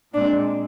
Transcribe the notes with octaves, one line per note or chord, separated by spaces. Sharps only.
A#2 G#3 C4 D4 D5